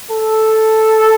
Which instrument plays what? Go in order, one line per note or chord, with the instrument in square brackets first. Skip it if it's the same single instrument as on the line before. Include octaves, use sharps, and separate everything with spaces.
[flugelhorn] A4